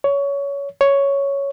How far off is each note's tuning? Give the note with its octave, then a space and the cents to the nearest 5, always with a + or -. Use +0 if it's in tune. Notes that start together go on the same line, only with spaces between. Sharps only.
C#5 +20
C#5 +5